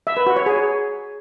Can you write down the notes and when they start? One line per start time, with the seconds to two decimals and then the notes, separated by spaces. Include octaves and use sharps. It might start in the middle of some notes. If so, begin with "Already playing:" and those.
0.07 E5
0.17 B4
0.27 F#4
0.36 C#5
0.46 G#4